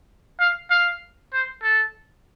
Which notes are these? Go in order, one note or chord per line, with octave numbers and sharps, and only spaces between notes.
F5
F5
C5
A4